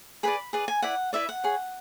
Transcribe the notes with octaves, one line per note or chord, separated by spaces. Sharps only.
G#4 B4 D5 B5
G#4 B4 D5
G#5
E4 B4 D5 F#5
E4 B4 D5 E5
F#5
G#4 C#5